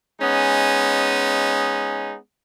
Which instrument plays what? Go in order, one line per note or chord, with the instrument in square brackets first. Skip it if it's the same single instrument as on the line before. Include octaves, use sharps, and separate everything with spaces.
[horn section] G#3 B3 C#4 D#4